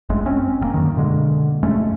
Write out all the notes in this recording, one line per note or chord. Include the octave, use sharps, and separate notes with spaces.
G1 F#2 G#3 A3
C4 C#4
F#1 A2 A#3
F#2 D#3
B2 D3 G#3 A#3
F#2 G#3 A3 C#4